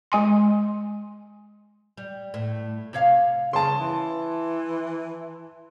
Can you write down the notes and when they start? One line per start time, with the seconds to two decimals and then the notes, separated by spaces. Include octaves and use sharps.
0.12 G#3 G#5 C6
1.97 G3
2.34 A2
2.93 C3 C#5 F5
3.53 C#3 A5 C6
3.80 E3